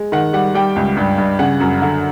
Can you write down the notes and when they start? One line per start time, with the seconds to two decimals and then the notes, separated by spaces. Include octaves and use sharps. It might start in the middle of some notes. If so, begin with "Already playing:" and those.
Already playing: G#3
0.12 D#3 F#5
0.33 G3 F#5
0.55 G3 G5
0.76 C#2
0.97 G2
1.18 G2
1.39 C#3 F#5
1.60 F#2
1.82 D3